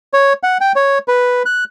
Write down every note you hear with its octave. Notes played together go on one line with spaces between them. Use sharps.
C#5
F#5
G5
C#5
B4
F#6